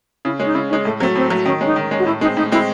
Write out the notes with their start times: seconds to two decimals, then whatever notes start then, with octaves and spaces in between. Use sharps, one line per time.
0.25 C#3 E4
0.40 G#3 C#4
0.46 D#4
0.55 C#3 E4
0.70 C#4 D#4
0.73 G#3
0.85 A2 A3
1.00 F#3 A3 C4
1.15 A2 C4
1.30 F#3 A3
1.45 D#3 C#4
1.61 G#3 C#4 D#4
1.76 D#3
1.91 G#3 C#4
1.99 F#4
2.06 A2 E4
2.21 G#3 D#4
2.25 C4
2.37 A2 D#4
2.52 G#3 C4 E4